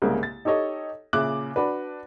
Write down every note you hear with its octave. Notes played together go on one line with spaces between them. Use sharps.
C2 G#2 C#3 A#3
A6
D#4 G4 A4 C#5 D#5
A#2 C#3 E5 D6 F#6 F#7
D4 F#4 B4